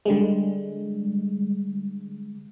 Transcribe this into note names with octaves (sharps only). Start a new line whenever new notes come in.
D3 G3 G#3